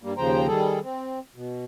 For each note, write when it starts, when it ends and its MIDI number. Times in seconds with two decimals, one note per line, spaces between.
0.03 0.13 43
0.03 0.13 55
0.03 0.13 58
0.17 0.47 39
0.17 0.47 49
0.17 0.47 53
0.17 0.47 72
0.17 0.47 79
0.17 0.47 82
0.48 0.79 51
0.48 0.79 55
0.48 0.79 68
0.48 0.79 69
0.83 1.19 60
1.35 1.65 47